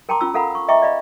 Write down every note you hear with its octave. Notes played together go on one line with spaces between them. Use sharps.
A#4 G5 A5 A#5 C6 D6
C#4 F4 E6
A4 A#4 F5 F#5 A#5 B5
C#6
D#5 E5 G5 A#5 C#6 D6
D5 D#5 F5 B5